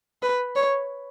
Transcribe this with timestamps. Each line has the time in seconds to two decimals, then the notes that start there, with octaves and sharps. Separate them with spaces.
0.22 B4
0.55 C#5